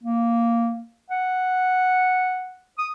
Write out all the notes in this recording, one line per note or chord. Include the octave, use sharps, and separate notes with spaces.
A#3
F#5
D#6